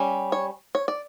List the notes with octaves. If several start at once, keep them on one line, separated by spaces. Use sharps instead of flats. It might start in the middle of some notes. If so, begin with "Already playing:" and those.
Already playing: G3 C#4
C#5
C#5
D5